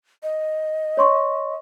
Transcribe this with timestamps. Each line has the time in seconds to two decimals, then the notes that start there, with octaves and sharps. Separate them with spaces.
0.23 D#5
0.97 C#5 C6 C#6